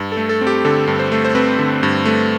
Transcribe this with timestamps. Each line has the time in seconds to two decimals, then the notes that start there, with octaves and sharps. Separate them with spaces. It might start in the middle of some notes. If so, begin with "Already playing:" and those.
Already playing: G2
0.12 A4
0.17 A3
0.29 A4
0.41 C4
0.47 G4
0.65 D3 A4
0.87 G2
0.99 C5
1.12 A3
1.25 C5
1.35 C4 B4
1.59 D3
1.83 G2
2.05 A3